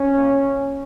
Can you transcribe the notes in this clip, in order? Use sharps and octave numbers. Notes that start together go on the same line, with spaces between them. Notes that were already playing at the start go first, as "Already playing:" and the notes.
Already playing: C#4
A#2 A#3